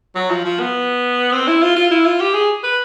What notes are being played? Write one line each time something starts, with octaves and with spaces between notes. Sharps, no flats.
F#3
F3
F3
B3
C4
E4
F4
F4
E4
F4
G4
G#4
B4